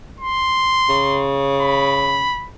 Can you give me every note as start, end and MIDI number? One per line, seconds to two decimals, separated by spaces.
0.20 1.26 84
0.89 2.34 49
1.61 2.49 83